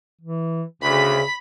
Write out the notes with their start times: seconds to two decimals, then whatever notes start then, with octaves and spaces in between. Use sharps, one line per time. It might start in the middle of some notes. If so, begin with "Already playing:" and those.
0.22 E3
0.82 D2 C#3 B5 B6